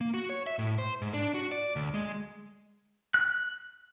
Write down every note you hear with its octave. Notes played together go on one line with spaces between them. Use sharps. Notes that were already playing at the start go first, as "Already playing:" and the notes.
A#3
F#4
C#5
E5
A2
C5
G#2
D4
F#4
D5
D2
G#3
F#6